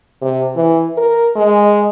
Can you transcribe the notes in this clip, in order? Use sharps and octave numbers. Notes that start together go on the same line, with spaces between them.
C3
E3
A#4
G#3